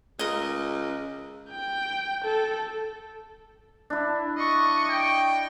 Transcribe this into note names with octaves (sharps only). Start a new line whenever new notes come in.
C#2 A#4 D#5
G5
A4
D4 E4
D#5 C#6
G5